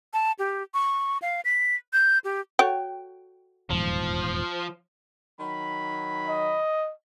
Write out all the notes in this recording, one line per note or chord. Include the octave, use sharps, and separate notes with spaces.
A5
G4
C#6
F5
B6
G6
G4
F#4 A4 C#5 G5
D#1 E2 G#2 F3
D#3 F#3 B5
D#5